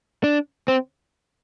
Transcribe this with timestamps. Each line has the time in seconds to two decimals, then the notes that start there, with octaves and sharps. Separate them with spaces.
0.24 D4
0.68 C4